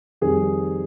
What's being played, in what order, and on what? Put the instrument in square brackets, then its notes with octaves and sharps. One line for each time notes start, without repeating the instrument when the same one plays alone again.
[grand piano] F2 D#3 G3 G#4